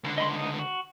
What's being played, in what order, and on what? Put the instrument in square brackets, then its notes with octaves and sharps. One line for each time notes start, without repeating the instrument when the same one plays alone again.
[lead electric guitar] C#2 D3
[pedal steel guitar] D#5 B5 C6
D#4
F#4